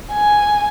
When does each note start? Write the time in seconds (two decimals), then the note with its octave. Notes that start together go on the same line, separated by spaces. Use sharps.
0.13 G#5